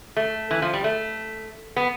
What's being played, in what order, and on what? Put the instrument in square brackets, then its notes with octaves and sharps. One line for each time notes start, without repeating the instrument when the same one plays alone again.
[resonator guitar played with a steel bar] A3
E3
F3
G3
A3
B3